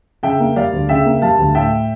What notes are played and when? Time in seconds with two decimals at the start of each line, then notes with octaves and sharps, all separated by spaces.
0.23 C#3 E5 G5
0.40 A#3
0.56 G3 D5 F5
0.73 D2
0.89 C#3 E5 G5
1.06 A#3
1.22 G3 F5 A5
1.38 D2
1.55 A2 E5 G5